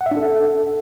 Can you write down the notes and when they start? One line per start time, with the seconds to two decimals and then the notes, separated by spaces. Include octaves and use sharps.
0.01 F#5
0.06 E5
0.11 D4
0.17 A4